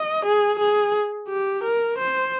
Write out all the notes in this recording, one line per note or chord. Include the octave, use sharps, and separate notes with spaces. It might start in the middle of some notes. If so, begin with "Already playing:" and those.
Already playing: D#5
G#4
G#4
G4
A#4
C5